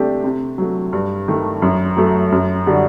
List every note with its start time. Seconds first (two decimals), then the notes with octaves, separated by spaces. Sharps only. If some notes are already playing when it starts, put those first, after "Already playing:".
Already playing: C3 A3 D4 G4
0.24 C3
0.58 F#3 A3
0.93 G2
1.28 D#3 A3
1.62 F#2
1.97 F#3 A3
2.32 F#2
2.66 D3 G3 D4 F#4